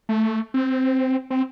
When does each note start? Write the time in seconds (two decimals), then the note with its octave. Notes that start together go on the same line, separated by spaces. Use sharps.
0.09 A3
0.54 C4
1.30 C4